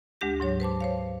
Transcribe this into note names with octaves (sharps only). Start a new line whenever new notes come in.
D2 G#3 D4 G4 A#6
G#2 F#3 C#5
B4 C5 A5 D6
C5 C#5 F5